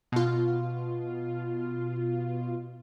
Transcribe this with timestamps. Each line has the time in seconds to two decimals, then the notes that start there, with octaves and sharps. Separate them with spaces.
0.12 B2 F4